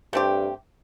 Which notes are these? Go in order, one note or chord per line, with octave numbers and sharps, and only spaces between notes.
G2 A3 C4 G4